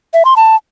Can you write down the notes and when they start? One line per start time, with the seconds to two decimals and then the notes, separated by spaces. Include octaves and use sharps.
0.14 E5
0.25 C6
0.36 A5